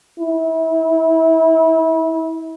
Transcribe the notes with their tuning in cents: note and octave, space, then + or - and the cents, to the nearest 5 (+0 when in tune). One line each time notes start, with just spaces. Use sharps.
E4 -30